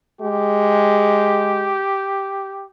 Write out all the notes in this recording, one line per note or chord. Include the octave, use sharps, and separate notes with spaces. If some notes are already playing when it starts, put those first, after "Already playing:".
G#3 G4